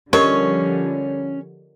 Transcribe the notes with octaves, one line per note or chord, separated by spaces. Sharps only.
D3 F3 G3 C#4 G4 A#4 C#5 D#5